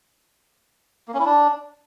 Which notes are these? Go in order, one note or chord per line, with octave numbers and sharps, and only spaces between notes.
A#3
C#4
E4
D4